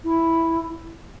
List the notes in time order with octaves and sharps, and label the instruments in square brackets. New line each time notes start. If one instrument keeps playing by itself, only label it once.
[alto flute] E4